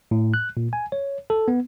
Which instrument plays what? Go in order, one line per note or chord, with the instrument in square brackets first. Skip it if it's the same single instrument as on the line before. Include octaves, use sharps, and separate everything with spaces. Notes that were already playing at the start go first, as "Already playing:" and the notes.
[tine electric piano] A2
F#6
A#2
G#5
C#5
A4
B3